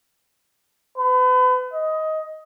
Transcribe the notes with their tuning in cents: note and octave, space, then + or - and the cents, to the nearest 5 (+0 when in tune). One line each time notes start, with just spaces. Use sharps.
B4 +35
D#5 +15